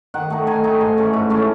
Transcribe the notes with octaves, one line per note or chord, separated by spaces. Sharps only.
D#3 F#5
A3 D#4
D#3 G#5
A3 D#4
G#2 C6
E3 A3 C#4
G#2
E3 A3 C#4